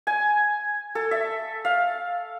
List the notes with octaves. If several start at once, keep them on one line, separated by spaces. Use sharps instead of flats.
G#5
A4
E5
F5